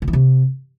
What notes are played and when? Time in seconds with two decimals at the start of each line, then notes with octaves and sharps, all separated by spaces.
0.02 D3
0.08 E3
0.13 C3